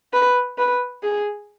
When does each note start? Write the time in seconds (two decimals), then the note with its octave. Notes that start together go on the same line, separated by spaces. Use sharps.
0.13 B4
0.58 B4
1.03 G#4